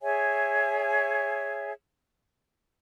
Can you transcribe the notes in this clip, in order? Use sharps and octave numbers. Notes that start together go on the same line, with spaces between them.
G#4 C#5 E5 G#5